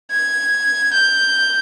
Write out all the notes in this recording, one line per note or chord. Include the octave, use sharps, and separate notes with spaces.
G#6
G6